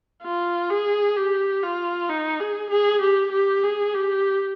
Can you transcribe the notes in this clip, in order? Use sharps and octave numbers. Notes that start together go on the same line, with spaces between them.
F4
G#4
G4
F4
D#4
G#4
G#4
G4
G4
G#4
G4